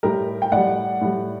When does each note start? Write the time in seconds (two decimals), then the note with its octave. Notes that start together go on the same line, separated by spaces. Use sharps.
0.03 A2 G3 G4 A#4
0.42 G5
0.52 A2 G3 D5 F#5
1.01 A2 G3